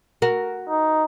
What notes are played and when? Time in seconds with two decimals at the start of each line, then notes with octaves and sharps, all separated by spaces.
0.22 F#4 A#4
0.69 D#4